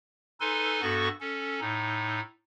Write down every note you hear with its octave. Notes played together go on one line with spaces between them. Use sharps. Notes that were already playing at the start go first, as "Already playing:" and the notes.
D#4 A4 B4 G#5 C6
G2 B3 F#4 A4 C#6
C#4 A4
A2 D#4